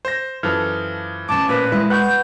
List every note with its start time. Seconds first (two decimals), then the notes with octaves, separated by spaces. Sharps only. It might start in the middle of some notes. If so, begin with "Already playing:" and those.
0.05 C5 A#6
0.43 F#2 E3 F3 A4 F6
1.29 A2 C#4 A5 D6
1.49 A#2 F3 B4
1.72 G#3 E4
1.90 B4 F#5 C#6 F#6 G6